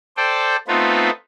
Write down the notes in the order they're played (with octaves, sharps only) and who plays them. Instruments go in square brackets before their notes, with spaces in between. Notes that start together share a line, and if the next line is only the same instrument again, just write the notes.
[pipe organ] A4 C5 D5 G5
A3 B3 C4 D#4 F4 B4